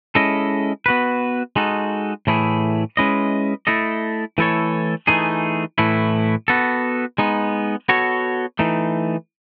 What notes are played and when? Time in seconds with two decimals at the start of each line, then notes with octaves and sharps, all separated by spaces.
0.15 G#3 C#4 E4 A4 D#5
0.86 B3 F#4 B4
1.56 G#3 D#4 F#4 A4
2.27 A2 E3 A3 E4 G#4
2.97 G#3 C#4 E4 B4 D#5
3.67 A3 E4 A4 D#5
4.38 E3 A3 E4 A4 C#5
5.07 E3 A3 D#4 G#4
5.78 A2 E3 A3 E4
6.48 B3 F#4 A4
7.18 G#3 B3 D#4
7.89 B3 F#4 A4 C#5
8.59 E3 A3 D#4